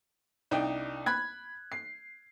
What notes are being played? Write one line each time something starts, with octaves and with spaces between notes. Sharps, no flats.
C2 D4 D#4 G5
B5 F#6 G#6
C7